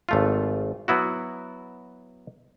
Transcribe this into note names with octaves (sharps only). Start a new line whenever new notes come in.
G#1 A3 F4
F#3 B3 E4 F#4